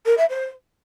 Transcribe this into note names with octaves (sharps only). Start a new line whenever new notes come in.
A#4
E5
C5